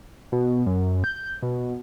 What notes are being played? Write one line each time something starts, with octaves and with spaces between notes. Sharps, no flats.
B2
F#2
G6
B2